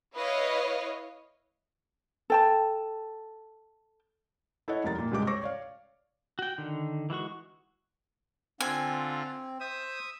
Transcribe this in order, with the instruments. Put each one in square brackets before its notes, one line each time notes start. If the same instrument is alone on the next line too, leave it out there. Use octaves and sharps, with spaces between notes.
[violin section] E4 B4 C#5 D#5 F5
[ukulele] A4 G5 A5
[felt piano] E4 A4 C#5 D#5 F#5
F1 G3 A#4 A#5 A6
A#2
C#2 G2 C3 G#3 G4 D6
C5 C#5 C#6 D6 E6 A#6
C#5 D5 F5
[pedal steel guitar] F#4 G5
D3 D#3
E3 G#3 F#4 C#6
[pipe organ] D3 F4 [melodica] C4 [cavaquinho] G#5
[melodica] C5 [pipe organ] E5 D#6